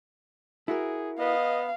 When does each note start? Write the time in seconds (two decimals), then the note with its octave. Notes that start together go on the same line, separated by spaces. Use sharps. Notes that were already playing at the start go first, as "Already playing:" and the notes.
0.68 E4 F#4 G#4 A#4
1.19 B3 D#5 F5